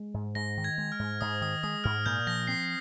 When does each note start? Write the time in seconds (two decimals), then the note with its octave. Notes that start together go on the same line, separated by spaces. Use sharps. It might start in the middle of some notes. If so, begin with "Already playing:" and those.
Already playing: G#3
0.14 G#2
0.35 G#2 A#6
0.58 D#3
0.64 G#6
0.78 G#3
0.92 F6
0.99 G#2
1.21 G#2 D#6
1.42 D#3 D#6
1.63 G#3 D#6
1.84 G#2 F6
2.06 A#2 G6
2.27 F3 A#6
2.47 C4 C7